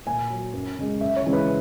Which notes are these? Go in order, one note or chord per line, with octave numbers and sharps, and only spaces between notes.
A#2 G#5
F#3
F#2
C#3 G#3
F#2 E5
C#5
C#3 E3 G#3
B4